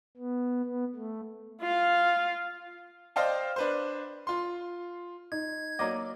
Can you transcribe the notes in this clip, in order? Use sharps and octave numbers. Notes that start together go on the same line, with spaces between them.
B3
B3
A3
F4 F5
C5 D5 D#5 F5 G5 A5
D4 B4 C5
F4 C6
D#4 G#6
F#3 A#3 D5 D#5